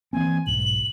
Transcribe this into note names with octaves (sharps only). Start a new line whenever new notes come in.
E3 A#3 C4 G#5
B1 G#2 F#7